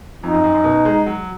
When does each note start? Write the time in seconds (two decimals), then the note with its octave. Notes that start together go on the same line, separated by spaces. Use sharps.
0.23 F2 D#4
0.33 F#2
0.44 F#2
0.54 F#2
0.64 B2
0.85 G#3
1.06 F#3